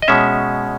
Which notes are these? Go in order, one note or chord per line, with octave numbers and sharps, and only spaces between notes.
D#5
B2 G#3 C#4 E5